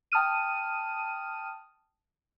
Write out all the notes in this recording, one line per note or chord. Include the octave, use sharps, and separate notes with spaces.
G5 A5 D#6 F6 D#7